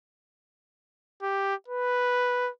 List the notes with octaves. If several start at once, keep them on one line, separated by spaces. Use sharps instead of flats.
G4
B4